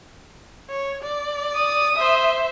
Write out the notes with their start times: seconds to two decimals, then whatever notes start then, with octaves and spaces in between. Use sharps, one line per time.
0.69 C#5
1.03 D5
1.55 D#6
1.96 C5 E5